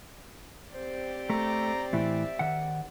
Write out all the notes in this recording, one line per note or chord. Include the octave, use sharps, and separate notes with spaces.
C4 G4 C5 D5
A3 A#5
A2 E3 E5
D#3 F#5